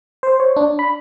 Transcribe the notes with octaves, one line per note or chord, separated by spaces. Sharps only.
C5
C#5
D4
B5